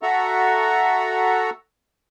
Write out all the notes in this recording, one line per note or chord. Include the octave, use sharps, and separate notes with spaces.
F#4 A4 E5 F#5 A#5